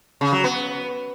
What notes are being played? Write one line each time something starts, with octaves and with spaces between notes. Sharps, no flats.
C#3
F#3
B3